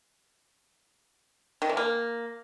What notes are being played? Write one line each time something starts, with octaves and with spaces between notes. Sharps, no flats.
D#3
E3
A#3